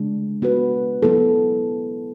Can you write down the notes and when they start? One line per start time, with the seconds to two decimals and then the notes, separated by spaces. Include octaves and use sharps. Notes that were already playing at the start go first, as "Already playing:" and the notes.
Already playing: C#3 G#3 D4
0.42 B3 F#4 B4
1.03 F#3 B3 E4 A4